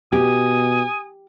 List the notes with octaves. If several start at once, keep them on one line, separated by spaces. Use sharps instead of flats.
B2 G4 G#5 D#6